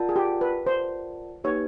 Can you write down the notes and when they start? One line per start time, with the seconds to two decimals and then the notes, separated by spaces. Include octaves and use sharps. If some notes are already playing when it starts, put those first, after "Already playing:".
Already playing: F4 A#4 D5 F#5 A5
0.09 G#4
0.16 G4
0.41 B4
0.67 F4 A#4 C5 D5 F#5 A5
1.44 A#3 D#4 G4 B4 C#5